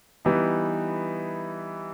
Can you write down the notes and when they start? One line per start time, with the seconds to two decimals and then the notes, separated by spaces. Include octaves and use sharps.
0.25 E3 G3 B3 D#4